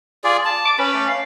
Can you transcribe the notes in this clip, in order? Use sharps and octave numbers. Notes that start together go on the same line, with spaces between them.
F4 G#4 D5
A5
D6
C#4 B4
A3
F5